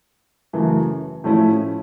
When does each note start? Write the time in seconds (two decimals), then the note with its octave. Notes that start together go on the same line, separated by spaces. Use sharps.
0.53 F#2 C#3 E3 A3
1.24 A2 F3 A3 C#4 E4